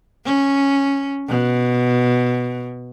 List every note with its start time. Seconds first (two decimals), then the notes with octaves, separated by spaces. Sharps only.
0.25 C#4
1.28 B2